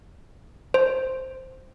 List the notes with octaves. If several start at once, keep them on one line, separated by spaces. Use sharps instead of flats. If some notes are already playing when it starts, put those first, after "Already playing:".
C5